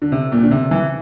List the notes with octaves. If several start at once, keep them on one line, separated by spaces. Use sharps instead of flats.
D3
C3
A#2
D3
C3
E3